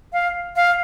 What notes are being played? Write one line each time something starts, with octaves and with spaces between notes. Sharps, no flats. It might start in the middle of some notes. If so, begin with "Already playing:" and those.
F5
F5